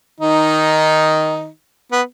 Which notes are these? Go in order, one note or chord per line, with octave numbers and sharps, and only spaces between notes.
D#3 D#4
B3